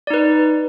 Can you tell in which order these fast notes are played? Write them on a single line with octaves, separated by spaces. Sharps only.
D5 D#4 B4